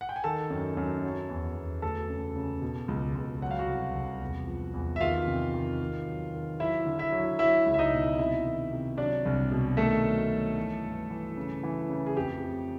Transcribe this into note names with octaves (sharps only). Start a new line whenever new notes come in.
F#5
G5
G#5
D#3 A4 A5
F#2
F#2
F#3
E2
E2
D2 A4 A5
C#3
C#3
B2
C#2
C#2
F#3 F#5
F5
F#4 F#5
C2
C2
E2
F3
E2
E5
D#3 F4 F5
C3
D#3
D#3
F#3
D#3
F#3 E4 E5
D3
E4 E5
F#3
F#3 E4 E5
C#2
E5
D#4 D#5
B2
C3 E4 E5
D#3
C3
F#3 D4 D5
C2
B2
D#3 A3 A4
F#3
F#3
E3
G2
E3
C#3
E3
C#3
G#4
F2 G4
F2